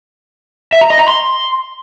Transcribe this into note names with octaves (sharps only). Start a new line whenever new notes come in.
E5
A#5
D#5
A#5
C6